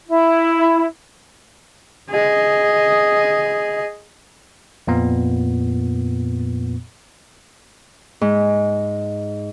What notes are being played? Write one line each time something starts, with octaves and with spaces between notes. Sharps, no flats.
E4
G#4 D#5
F2 A#2 B3
G#2